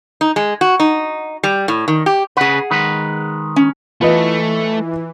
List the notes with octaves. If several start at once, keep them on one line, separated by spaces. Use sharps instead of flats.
D#4
G#3
F#4
D#4
G3
A2
D#3
G4
C#3 G#4 B4 F#5
D#3 G#3 B4
C#4
E3 A3 F4 B4 D#5